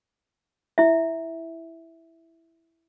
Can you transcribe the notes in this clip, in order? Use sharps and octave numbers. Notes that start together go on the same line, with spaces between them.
E4 E5